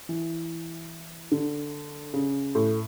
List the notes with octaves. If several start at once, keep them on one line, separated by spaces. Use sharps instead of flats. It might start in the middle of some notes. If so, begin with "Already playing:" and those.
E3
D3
C#3
A2